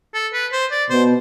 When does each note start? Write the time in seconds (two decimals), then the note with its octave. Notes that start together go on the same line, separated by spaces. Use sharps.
0.14 A4
0.34 B4
0.53 C5
0.71 D5
0.90 B2 C5